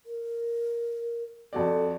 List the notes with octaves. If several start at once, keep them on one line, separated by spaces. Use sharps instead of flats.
A#4
F2 F#4 A4 D5